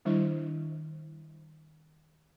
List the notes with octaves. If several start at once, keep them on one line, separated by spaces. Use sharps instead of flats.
D#3 G3 D4 E4 C5 D#5